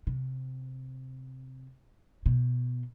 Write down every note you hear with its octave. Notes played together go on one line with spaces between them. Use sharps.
C3
B2